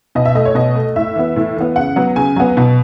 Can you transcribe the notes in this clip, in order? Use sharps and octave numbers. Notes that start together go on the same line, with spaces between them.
B2 D#5
E5
A3 D#5
C#5
B2 D#5
A3
A2 E5
E3 B3
A2
E3 B3
C#3 F#5
F#3 B3
C#3 G#5
F#3 B3
B2